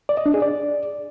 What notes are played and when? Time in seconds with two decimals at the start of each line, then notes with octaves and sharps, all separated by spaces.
0.09 D5
0.17 D#5
0.26 D4
0.34 G#4
0.42 D5